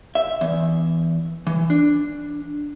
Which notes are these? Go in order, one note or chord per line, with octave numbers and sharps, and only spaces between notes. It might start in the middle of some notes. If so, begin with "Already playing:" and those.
E5
E2
E3
D4